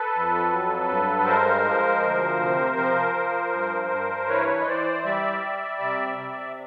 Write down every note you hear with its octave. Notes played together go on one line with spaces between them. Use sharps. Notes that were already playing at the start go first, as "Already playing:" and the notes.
Already playing: A4 B4
F2
F#3
G2
G#3 A#4 C5
F3
D2
C3
F3
F3
G2
G2
E3 B4 C#5
D#5
E3 C5 D5
G3 D5 E5
G3
C3
C3